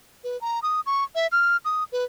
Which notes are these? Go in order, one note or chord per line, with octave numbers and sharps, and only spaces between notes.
B4
A#5
D#6
C#6
E5
F6
D#6
B4